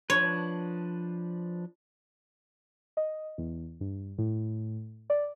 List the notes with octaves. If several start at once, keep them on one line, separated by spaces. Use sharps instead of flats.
F3 D4 B4 C#5
D#5
E2
G2
A2
D5